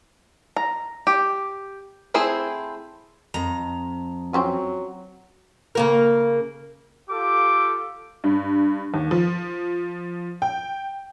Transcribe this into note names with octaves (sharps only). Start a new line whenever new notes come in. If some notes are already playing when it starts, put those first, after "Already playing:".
A#5
G4
A3 C4 E4 G#4 C5
F2 A#5
F#3 C4 C#4 F4
C#3 A#3 A#4
F4 G4 A4 D6
G2
D#2
F3
G5